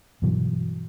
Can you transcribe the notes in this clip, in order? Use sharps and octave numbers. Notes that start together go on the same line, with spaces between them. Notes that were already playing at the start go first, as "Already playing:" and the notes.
G2 B2 E3 F#3